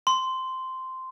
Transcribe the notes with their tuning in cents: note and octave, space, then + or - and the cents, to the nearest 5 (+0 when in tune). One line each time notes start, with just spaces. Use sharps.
C6 -10